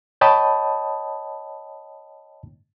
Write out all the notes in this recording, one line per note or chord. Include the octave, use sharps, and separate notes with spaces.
C#5 D#5 G5 A5 B5 D#6